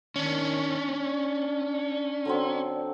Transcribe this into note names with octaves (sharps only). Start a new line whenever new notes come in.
D#3 C#4 D4
D5
D3 F#3 C4